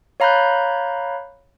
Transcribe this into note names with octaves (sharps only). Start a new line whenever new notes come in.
C#5 F5 A#5 B5 F#6 G6